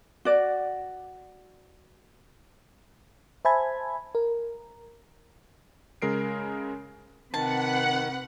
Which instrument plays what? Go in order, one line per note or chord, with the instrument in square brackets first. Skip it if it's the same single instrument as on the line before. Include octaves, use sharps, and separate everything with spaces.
[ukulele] F#4 D5
[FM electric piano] C5 E5 G#5 A5 B5 G#6
A#4
[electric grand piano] C#3 G#3 A#4 C7 D7
[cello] C3 B4 [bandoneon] D#3 [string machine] F#5 [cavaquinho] A5